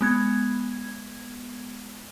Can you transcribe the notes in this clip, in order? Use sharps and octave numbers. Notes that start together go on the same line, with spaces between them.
G#3 B3 G#6